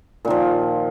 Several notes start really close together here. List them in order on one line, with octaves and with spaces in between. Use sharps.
A#2 D#3 F3